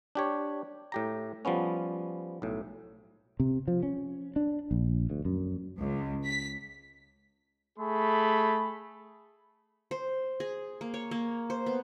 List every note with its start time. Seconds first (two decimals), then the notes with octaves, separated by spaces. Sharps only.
0.15 D4 G4 C#5
0.92 A2 G4 A#5
1.45 F3 G3 B3 C#4
2.42 B1 A2
3.40 C3
3.68 F3
3.83 C#4
4.36 D4
4.71 A#1
5.10 D2
5.25 F#2
5.77 C#2
6.24 B6
7.79 A3 G#4 B5
9.91 C5
10.40 G#4
10.81 A#3
10.94 C#5
11.11 A#3
11.50 C5
11.66 B3